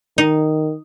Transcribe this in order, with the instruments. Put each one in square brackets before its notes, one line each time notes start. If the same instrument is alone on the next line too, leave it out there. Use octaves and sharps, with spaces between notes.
[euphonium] D#3 [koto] D#4